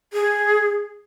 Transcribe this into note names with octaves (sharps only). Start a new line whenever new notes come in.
G#4